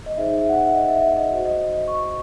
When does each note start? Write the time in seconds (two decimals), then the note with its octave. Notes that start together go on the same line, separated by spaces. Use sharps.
0.06 D#5
0.17 D#4 G#4 C5 E5
0.37 E5
0.49 F#5
0.56 E5
0.74 D#5
0.88 E5
1.02 E5
1.16 D#5
1.31 F#4 D#5
1.35 C5
1.45 D#5
1.59 D#5
1.73 D#5
1.88 C#6